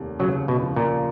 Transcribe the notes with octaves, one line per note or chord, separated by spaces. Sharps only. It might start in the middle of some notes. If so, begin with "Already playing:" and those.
Already playing: F1 D#2
C#3 F#3
B2
F3
A#2